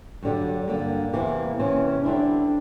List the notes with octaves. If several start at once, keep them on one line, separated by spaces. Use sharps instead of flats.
G2 D3 F#3 G3
G2 D3 G3 A#3
E2 C3 E3
E2 C3 E3 C#4
D3 G3 C4 D4 E4